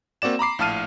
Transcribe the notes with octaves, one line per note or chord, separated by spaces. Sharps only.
A#3 C4 F#4 D5 E7
A#5 B5 D6 C7
A#1 A2 F5 A5 F6 D#7